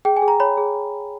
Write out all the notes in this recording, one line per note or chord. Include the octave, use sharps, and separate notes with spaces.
G#4 G5
G#5
G#4
A#5
C#5 B5
G#4